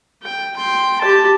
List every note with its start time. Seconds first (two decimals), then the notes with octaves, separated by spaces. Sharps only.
0.23 G5
0.56 G5 C6
1.01 G4 A5